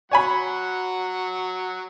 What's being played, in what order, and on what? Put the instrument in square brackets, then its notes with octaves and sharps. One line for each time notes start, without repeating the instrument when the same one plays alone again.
[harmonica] F#3 F#5 [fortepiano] C#5 G#5 B5